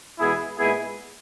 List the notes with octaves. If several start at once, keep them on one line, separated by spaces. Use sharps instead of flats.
E2 B2 G#3 B3 E4 G#4
A#2 G#3 B3 E4 G#4